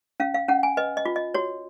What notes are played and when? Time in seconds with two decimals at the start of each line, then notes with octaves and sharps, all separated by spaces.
0.20 C#4 F5
0.34 F5
0.48 C#4 F#5
0.63 G#5
0.77 B4 D#5
0.97 D#5
1.05 F4
1.16 D#5
1.34 F#4 C#5